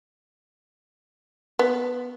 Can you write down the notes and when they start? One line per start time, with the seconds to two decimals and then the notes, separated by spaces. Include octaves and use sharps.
1.59 B3